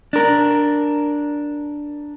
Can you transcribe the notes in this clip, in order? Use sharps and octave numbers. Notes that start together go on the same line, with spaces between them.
D4 A#4